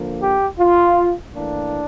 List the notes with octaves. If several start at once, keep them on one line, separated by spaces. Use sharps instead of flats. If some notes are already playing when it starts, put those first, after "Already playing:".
Already playing: D3 F3 A#3
G4
F4
A2 E3 A#3 D4